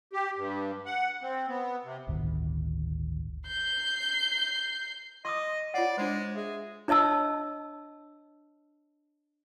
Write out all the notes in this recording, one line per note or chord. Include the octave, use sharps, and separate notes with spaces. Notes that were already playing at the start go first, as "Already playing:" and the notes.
G4
G2
F#5
C4
B3
C3
G1 D2 A2 D#3
G6 C7
D#5 C6 D6 D#6
F4 C#5 D5 F#5
G#3 D4 C5
G#4 E5
D4 C#5 D#5 A5 E6